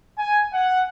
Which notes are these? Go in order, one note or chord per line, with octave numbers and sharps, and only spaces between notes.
G#5
F#5